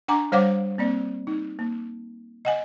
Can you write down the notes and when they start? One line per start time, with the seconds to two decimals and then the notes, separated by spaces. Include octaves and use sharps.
0.08 D4 F#5 G#5 A#5 D6
0.32 G3 C5 C#5 F5 F#5 D6
0.78 A#3 C4 D5
1.27 D#4
1.59 A#3
2.45 D#5 F#5 G#5